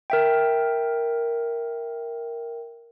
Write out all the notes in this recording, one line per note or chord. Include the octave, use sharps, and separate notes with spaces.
A#4 E5 G5